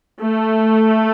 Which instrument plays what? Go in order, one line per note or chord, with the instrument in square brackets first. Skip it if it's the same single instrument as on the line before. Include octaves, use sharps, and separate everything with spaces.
[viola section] A3